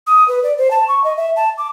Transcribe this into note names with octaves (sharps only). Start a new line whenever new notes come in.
D#6
B4
D5
C5
A5
C#6
D#5
E5
A5
D6